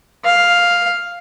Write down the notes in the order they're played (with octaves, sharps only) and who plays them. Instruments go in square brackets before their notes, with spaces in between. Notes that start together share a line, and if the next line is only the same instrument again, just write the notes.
[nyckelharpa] F5